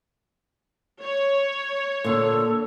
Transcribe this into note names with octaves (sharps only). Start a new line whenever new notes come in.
C#5
A#2 D3 A4